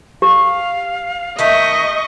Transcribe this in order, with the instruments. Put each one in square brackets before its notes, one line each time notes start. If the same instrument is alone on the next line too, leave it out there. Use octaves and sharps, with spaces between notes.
[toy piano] G4 [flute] F5
[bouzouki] D#3 A3 D#4 [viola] D#5 C#6 [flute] B6